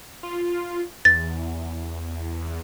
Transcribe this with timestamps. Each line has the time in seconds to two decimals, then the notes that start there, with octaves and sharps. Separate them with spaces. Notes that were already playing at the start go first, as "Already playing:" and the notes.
0.23 F4
1.05 E2 A6